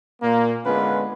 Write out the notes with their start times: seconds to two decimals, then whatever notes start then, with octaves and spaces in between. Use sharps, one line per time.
0.22 A#2 A#3
0.65 D3 G#3 B3 C#4 F4 B4